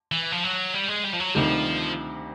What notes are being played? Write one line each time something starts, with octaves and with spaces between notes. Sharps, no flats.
E3
F3
F#3
G3
G#3
G3
F3
F#3
D2 C3 D#3 F3 G3